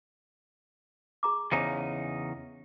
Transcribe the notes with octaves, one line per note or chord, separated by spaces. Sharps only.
G#4 A#5 D6
E2 C#3 D#4 C5 G#5